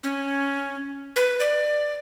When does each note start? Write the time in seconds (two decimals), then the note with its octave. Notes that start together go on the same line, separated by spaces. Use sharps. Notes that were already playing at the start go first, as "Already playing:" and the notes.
0.03 C#4
1.16 B4
1.40 D5